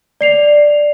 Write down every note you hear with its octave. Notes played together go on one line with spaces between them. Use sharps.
D5 C7 F7